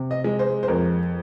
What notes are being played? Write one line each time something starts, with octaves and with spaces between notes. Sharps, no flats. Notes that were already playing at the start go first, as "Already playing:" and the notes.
Already playing: C3
D#5
G#3
C5
C5
F2 A#4